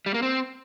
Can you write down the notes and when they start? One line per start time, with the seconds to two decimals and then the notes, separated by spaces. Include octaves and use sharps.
0.06 G3
0.14 A#3
0.22 C4